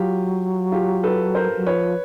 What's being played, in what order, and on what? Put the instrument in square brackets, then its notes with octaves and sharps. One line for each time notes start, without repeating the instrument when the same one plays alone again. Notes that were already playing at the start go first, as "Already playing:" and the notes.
Already playing: [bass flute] F#3 [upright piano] F4 G4
[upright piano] F4 G4
A4 B4
A#4 C5
[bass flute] F#3
[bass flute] F3 [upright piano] B4 C#5